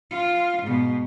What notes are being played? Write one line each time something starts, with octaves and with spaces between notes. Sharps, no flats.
F4
G#2 B2